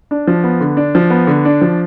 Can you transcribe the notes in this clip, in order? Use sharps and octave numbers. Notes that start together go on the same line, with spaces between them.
D4
F3
B3
D3
D4
F3
B3
D3
D4
F3